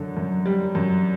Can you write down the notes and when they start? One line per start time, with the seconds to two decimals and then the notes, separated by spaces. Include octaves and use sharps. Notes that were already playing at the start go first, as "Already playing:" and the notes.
Already playing: F#2 D3
0.17 F#2
0.46 G3
0.75 F#2